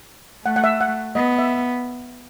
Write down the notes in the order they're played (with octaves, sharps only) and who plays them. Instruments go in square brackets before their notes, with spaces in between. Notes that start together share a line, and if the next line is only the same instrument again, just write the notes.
[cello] A3 [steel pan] F#5
[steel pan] F#5
E5
F#5
[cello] B3 [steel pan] D#5
[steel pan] E5